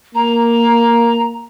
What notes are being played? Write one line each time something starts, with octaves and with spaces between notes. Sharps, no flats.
A#3 A#5